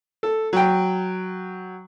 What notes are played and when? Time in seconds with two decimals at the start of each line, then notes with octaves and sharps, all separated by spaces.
0.23 A4
0.53 F#3 G5